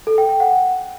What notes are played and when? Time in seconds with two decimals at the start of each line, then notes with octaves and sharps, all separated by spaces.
0.07 A4
0.18 G5
0.29 G5
0.40 F#5